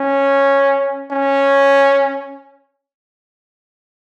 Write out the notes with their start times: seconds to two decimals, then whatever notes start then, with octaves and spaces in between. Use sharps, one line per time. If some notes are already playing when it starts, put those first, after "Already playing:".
Already playing: C#4
1.11 C#4